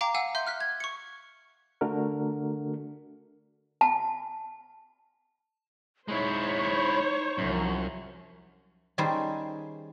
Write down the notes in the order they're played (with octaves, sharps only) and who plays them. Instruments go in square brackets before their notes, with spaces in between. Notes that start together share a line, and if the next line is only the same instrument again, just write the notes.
[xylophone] F5 G5 A#5 D6
F5 F#5 G#5 E6
E5 C6 G6
F6 F#6 B6
G#6
C#6 C#7
[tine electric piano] D3 A3 D4 F#4 A#4
[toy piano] A5
[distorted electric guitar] G#3 E4 [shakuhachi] D#4 [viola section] C5 C#5
[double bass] C2 F3 [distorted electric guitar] F#2
[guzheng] D#3 G3 C#4 G#4 C5